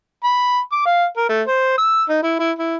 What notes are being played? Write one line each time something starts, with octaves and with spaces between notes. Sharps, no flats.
B5
D6
F5
A#4
A3
C5
E6
D#4
E4
E4
E4